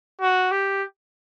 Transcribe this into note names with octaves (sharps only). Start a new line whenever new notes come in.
F#4
G4